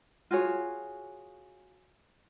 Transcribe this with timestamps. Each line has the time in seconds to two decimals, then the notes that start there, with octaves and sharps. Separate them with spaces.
0.31 F4 F#4 G#4 C#5